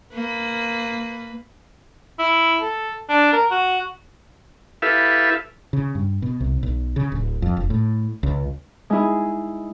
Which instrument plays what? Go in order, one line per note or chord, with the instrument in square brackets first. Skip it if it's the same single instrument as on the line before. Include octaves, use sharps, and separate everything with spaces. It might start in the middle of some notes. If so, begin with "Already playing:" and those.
[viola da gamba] A#3 B4
[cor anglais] E4
A4
D4
A#4
F#4
[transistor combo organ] E4 G4 A4 B4 E5 F5
[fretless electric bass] C#3
G2
B2
C2
B1
C#3
D1
F2
E1
A2
C#2
[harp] G#3 D#4 E4 G#4